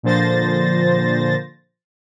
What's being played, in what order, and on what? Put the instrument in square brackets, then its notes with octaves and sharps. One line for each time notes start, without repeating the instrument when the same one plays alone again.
[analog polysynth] A#2 D3 F3 C5 A6 A#6